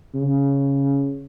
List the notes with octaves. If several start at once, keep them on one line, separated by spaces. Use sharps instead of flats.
C#3